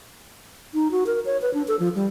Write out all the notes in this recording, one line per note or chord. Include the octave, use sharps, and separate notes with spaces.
D#4
F#4
A#4
C#5
B4
D4
A4
F3
G3